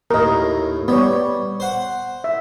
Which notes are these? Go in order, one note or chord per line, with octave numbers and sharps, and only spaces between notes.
D#2 A2 A#4 D#5
G3 B3 C#5
C5 F#5
E5